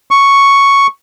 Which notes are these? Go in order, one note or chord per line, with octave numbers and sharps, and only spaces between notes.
C#6